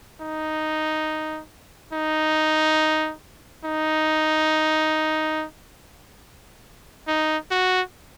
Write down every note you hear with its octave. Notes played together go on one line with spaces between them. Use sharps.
D#4
D#4
D#4
D#4
F#4